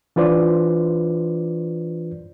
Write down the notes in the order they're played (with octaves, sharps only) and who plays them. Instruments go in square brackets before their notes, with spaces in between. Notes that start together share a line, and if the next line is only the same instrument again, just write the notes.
[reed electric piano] E3 D4 F4 B4 C5 D5